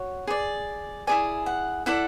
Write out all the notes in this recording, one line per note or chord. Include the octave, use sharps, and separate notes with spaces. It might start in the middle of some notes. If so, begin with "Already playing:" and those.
Already playing: F#4 C#5
G#4 D5
E4 G#4 D5 G#5
F#5
E4 A4 D5 F#5